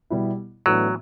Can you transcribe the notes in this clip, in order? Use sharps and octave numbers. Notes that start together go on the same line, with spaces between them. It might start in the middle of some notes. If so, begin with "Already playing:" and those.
B2 G3 B3 E4
A2 E3 F#3 B3 D4